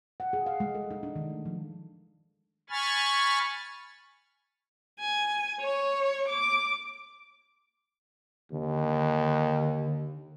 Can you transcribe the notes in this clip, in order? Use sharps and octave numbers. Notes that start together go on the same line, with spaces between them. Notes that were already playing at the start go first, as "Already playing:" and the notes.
F#5
G#4
F5
G#3
A4
D#4
D4
D#3
A3
F3
G#5 B5 C#6 F6 A6
G#5
C#5
D6
D#2 D3